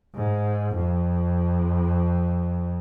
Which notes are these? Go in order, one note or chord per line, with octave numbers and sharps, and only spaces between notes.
G#2
F2